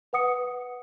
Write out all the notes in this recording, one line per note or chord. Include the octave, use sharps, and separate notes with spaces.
B4 F#5 D#6 C#7